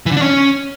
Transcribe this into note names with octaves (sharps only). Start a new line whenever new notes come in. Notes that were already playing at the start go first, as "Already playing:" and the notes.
E3
D3
D4
C#4